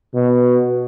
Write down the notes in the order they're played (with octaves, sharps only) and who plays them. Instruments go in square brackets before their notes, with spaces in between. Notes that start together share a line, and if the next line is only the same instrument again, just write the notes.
[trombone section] B2